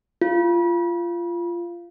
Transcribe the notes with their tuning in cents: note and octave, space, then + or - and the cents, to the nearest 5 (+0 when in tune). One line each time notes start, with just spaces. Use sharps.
F4 -15